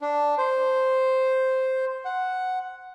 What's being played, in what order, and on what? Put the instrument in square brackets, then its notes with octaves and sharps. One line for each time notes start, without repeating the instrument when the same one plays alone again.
[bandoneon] D4
C5
F#5